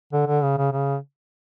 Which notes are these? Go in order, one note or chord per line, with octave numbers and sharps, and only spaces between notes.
D3
D3
C#3
C#3
C#3